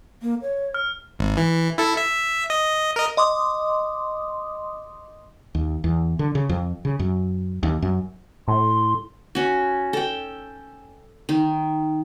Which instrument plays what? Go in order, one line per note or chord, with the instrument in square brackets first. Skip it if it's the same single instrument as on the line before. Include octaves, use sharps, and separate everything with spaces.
[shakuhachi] A#3
C#5
[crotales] F6
[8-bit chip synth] G#1
E3
E4 A4
E5
D#5
A#4 D#5
[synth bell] D#5 C6 D6 D#6
[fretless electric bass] D#2
E2
D3
C#3
F2
C#3
F#2
D#2
F#2
[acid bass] A2 [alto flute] C6
[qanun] C#4 F#4
A4 G5
D#3